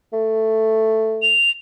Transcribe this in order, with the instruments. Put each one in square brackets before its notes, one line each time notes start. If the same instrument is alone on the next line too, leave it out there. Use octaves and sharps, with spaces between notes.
[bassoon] A3
[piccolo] F7